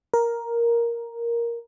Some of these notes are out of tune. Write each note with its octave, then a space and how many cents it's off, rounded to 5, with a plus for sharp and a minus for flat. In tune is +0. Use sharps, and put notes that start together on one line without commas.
A#4 +5